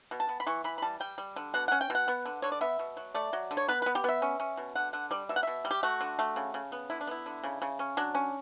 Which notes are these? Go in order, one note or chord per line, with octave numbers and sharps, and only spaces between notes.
B2
A5
B3
B5
E3 C#6
E3 B5
B5
G3 A5
G3 G5
G3
D3
B2 F#5
C#4 F#5
G5
B2 F#5
B3
D3
D3 C#5
D5
B3 E5
B2
F#3
A3 D5
F#3
D3
C#5
B3 B4
B3 B4
G4
B3 E5
C#4
C#4
B2
D3 F#5
D3 F#5
G3 D5
B2 E5
F#5
B2 E5
G3
G4
A3 F#4
D3
A3
C#3
C#3
B3
D3 E4
D4
B3 E4
D3
C#3
C#3
C#4
F#3 D4
C#4